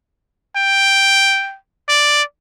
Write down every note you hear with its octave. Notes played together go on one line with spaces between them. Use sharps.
G5
D5